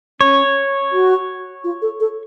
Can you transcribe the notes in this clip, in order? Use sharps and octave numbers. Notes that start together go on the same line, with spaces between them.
C#4 C#5
F#4
F4
A4
A4